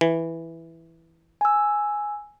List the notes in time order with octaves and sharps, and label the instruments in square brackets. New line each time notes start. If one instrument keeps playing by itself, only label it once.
[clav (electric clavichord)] E3
[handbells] G#5 E6